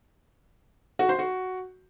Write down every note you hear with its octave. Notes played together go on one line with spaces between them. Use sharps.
F#4
C5
F#4